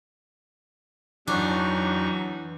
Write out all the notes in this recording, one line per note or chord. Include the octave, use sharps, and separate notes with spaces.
F2 E3 F#3 D4 D#4 C#6